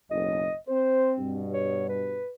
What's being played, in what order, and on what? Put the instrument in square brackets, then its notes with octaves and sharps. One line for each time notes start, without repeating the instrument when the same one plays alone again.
[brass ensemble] F#1 B1 [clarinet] D#5
[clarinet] C4 [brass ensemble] C5
[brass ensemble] G2 B2
[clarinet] C#5
B4